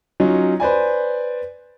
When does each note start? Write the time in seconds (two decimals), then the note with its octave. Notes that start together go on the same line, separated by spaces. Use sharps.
0.20 F#3 C#4 D#4 F4
0.60 B4 C5 D5 G#5